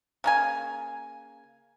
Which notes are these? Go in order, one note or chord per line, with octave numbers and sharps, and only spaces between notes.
C#3 A#3 G#5